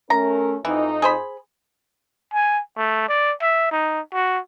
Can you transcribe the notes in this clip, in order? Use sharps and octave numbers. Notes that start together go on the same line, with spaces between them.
A3 C#4 A#4 A#5
F2 E3 D#4
G#4 C5 B5
G#5
A3
D5
E5
D#4
F#4